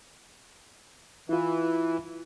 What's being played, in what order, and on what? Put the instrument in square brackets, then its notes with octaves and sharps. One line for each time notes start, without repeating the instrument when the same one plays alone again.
[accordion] E3 [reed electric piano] E4 F4